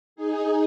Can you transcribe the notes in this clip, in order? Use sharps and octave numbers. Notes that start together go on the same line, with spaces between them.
D#4 G#4